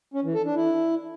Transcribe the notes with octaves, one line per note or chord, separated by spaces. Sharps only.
C#4
E3
A4
D4
E4